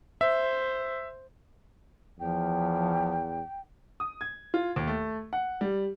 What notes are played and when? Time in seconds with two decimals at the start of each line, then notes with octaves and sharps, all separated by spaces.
0.21 C5 E5
2.20 E2 F3 G5
4.00 D#6
4.21 G#6
4.54 F4
4.76 D#2
4.87 A3
5.33 F#5
5.61 G3